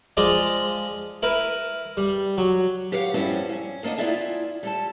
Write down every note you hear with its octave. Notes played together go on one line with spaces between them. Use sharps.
F3 G#3 D5 D#5 A#5
E4 A#4 B4
G3
F#3
G4 B4 C#5 F5 F#5
G2 F3 G3 B3 C#4 E4
C#4
E2 A#3 D4 D#5 F#5
B3 E4 F4 D5 E5 G#5
G3 A4 A5